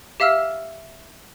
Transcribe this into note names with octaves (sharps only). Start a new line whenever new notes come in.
G4 E5 F5 E6 F6